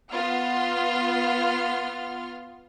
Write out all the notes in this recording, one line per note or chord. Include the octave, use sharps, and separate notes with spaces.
B3 F4 C6 F6